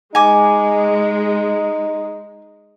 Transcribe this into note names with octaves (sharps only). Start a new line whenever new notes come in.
G#3 D#4 G#5 D6